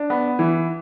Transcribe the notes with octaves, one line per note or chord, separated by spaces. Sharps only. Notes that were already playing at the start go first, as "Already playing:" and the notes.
Already playing: D4
B3
E3